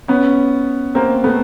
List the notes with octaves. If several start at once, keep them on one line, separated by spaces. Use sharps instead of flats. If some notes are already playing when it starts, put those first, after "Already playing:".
B3 C#4
A#3 C4
A3 B3